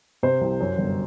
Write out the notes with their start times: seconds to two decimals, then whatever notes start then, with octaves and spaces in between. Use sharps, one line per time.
0.23 C3 C5
0.41 C2
0.60 F#2
0.78 G1